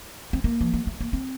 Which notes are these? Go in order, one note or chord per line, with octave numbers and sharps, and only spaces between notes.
C4
A#3
F3
F#3
A3
A#3
C4